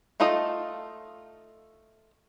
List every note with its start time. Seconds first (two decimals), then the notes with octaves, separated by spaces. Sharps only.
0.20 A3 D#4 F4 A4 D#5